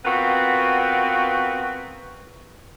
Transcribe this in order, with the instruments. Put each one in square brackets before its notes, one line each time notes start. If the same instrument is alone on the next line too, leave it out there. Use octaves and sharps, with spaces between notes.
[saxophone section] B3 C4 F4 F#4 A#4 B4